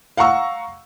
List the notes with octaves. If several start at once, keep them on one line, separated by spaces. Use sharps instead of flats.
F5 F#5 A#5 C#6 E6